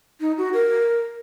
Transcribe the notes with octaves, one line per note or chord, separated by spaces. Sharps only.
D#4
F#4
A#4